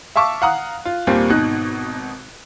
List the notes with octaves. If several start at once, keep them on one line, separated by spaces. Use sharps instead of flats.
E5 F5 A5 C#6 D6 E6
F5 F#5 A#5 D#6 F#6
F4
D#2 A#2 G3 A#3 C4
G#1 B2 D#4 F#6